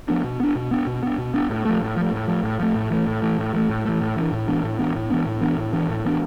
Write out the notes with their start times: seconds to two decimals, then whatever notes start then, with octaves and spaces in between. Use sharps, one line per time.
0.08 F3 B3 D4
0.24 B2
0.40 B3 D4
0.55 B2
0.71 B3 D4
0.87 B2
1.02 B3 D4
1.18 B2
1.34 B3 D4
1.50 A2
1.65 F3 A3
1.81 A2
1.97 F3 A3
2.12 A2
2.28 F3 A3
2.43 A2
2.60 F3 A3
2.75 A2
2.90 E3 A3
3.06 A2
3.22 E3 A3
3.38 A2
3.53 E3 A3
3.69 A2
3.85 E3 A3
4.01 A2
4.16 E3 B3 D4
4.31 A2
4.48 E3 B3 D4
4.63 A2
4.79 E3 B3 D4
4.95 A2
5.10 E3 B3 D4
5.26 A2
5.41 E3 B3 D4
5.57 A2
5.73 E3 B3 D4
5.89 A2
6.04 E3 B3 D4